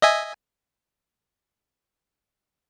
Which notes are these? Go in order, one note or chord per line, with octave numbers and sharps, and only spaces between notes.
D#5 E5 G#5